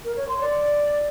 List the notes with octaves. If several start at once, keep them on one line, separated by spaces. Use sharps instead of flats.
A#4
C#5
C6
D5